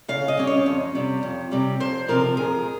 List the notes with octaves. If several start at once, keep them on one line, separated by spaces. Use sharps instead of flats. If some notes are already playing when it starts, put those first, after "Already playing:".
C#3 F5
D#5
G3 C#4
C#5
F2
C3 G3
F2
C3 G3
F2 C5
C3 F3 A#4
F2 G#4